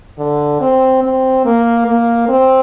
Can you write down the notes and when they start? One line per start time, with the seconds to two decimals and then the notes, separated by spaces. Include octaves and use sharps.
0.19 D3
0.61 C4
1.03 C4
1.46 A#3
1.87 A#3
2.29 C4